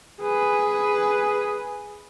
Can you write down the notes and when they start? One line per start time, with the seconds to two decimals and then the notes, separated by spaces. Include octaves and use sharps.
0.21 G#4 B4